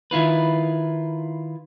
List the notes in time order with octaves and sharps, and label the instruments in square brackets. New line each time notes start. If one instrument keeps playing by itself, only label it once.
[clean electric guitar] D#3 E4 F4 B4